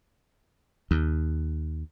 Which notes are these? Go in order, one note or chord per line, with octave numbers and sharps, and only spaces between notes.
D#2